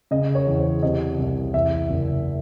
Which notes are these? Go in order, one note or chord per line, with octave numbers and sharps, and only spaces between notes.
C#3 D#5
C#5
E2
C5
C3 D#5
C2
E2 E5
F#1